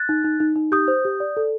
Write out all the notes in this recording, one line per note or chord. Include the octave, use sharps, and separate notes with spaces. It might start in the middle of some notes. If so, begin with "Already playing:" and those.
Already playing: F#6 A6
D#4
D#4
D#4
D#4
G4 D#6 G6
C5
G4
D5
A4